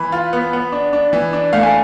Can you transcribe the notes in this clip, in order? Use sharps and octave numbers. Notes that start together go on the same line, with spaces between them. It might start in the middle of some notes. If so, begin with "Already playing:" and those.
Already playing: E3 B5
F4
B3
B3
D4
D4
E3
D4
A3 F5
G#5